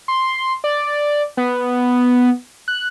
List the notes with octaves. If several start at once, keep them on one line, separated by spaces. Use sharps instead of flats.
C6
D5
B3
F#6